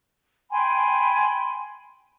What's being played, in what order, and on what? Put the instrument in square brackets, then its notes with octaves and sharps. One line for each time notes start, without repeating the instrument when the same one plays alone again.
[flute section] G5 G#5 B5 C6